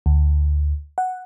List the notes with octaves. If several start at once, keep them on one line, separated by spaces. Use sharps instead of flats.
D2
F#5